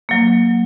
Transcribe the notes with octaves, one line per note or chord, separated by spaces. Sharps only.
F#3 A#3